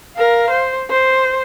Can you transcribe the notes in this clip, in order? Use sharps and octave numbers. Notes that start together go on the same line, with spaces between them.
A#4 F5
C5
C5